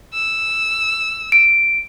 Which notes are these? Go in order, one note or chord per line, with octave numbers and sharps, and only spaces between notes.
E6
D7